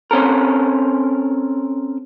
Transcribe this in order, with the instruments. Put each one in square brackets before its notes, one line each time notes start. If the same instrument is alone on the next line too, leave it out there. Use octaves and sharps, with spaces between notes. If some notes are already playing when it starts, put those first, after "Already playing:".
[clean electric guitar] C4 C#4 A4 A#4